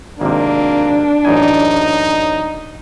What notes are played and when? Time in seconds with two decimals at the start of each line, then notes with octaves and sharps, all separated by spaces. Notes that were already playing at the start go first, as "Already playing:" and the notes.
0.21 G#1 C3 A#3 D4
1.25 A1 F#2 D#4 G#5